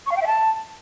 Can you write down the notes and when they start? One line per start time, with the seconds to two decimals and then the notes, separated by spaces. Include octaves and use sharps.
0.06 C#6
0.11 F5
0.17 G5
0.22 E5
0.27 A5